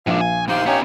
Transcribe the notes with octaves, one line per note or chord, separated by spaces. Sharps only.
A#1 G#2 D4 F5
G#5
D#4 G4 C5 F5 C6
B3 C#4 D#4 G4 C#5